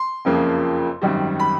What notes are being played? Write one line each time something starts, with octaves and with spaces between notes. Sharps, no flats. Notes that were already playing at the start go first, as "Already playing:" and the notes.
Already playing: C6
F#1 F2 C#3 F3 A#3
G#1 F#2 D#3 G3
B5